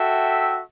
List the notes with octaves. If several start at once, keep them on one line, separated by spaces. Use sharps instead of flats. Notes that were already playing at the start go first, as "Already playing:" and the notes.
Already playing: F#4 A4 E5 G5